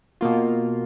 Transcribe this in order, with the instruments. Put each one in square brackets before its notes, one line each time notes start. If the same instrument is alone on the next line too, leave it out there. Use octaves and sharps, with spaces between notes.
[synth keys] B2 A#3 F4